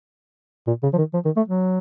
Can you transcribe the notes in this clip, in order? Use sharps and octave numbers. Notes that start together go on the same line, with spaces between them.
A#2
C#3
F3
D#3
F3
D#3
A3
F#3